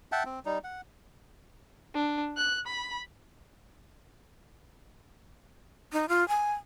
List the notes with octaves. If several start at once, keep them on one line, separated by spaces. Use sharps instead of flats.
E5 F#5 G5 A5
C4
G3 D#4
F#5
D4
F#6
B5
D#4
F4
G#5